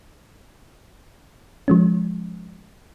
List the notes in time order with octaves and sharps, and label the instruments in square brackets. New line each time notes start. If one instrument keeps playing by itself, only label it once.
[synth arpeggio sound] F3 G#3 C#4